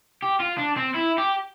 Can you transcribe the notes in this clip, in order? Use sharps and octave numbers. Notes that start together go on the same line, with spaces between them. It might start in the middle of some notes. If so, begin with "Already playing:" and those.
G4
F4
D4
C4
E4
G4